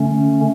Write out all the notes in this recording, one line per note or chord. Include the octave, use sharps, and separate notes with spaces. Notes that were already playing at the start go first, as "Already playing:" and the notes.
Already playing: D3 A3 C#4